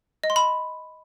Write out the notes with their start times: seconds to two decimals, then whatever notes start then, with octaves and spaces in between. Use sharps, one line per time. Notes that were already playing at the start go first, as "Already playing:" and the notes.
0.24 D#5
0.30 C6
0.36 B5